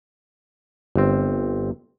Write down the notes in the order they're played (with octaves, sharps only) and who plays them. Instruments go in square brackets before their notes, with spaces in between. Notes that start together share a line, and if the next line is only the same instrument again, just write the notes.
[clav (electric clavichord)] G1 C4